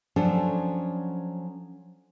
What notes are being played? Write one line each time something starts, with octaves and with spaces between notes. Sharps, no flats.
F3 F#3 C#4 D4 A4 C5